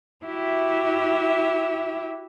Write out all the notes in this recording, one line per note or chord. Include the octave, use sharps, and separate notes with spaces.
E4 F#4 G4 E5